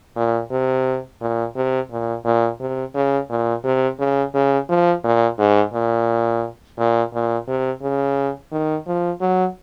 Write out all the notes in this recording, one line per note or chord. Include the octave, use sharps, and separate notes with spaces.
A#2
C3
A#2
C3
A#2
A#2
C3
C#3
A#2
C3
C#3
C#3
F3
A#2
G#2
A#2
A#2
A#2
C3
C#3
D#3
F3
F#3